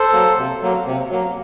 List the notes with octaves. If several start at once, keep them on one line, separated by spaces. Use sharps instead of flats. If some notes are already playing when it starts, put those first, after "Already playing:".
Already playing: A4 C5
F#3 A#3
C3
F#3 A#3
C3
F#3 A#3